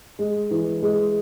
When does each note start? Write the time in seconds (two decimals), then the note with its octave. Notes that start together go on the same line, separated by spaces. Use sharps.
0.19 G#3
0.51 E3
0.82 G#3